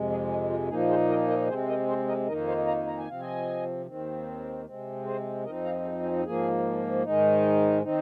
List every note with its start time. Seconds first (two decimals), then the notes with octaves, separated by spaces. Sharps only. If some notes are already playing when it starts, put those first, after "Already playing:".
Already playing: F2 C3 G#3
0.10 G#4
0.29 G#4
0.50 F4
0.69 A#2 F3 A#3 D#4 G#4
0.89 G#4 C5
1.09 A#4 D#5
1.28 A#4 D#5
1.48 C3 G#3 C4 G#4 C5
1.68 A#4 D#5
1.88 G#4 C5
2.08 A#4 D#5
2.27 F2 D#3 A#3 D#4 A#4 D#5
2.47 C5 F5
2.67 F5 A#5
2.87 A#5
2.98 G#5
3.07 C3 F3 C4 F5
3.20 D#5 G#5
3.86 D#2 D#3 C4
4.66 C3 G#3 C4
5.05 G#4 C5
5.45 F2 F3 C4 D#4 A#4 D#5
5.64 F5 A#5
5.85 G#4
6.04 G#4
6.25 G#2 F3 A#3 G#4
7.03 G#2 D#3 G#3 D#4
7.82 D#3 C4 D#4